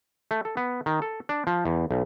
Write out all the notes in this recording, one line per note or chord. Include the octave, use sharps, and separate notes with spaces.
A3
A4
B3
D#3
A4
D4
F3
E2
B1